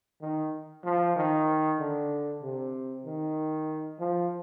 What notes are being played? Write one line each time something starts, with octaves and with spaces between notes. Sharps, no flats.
D#3
F3
D#3
D3
C3
D#3
F3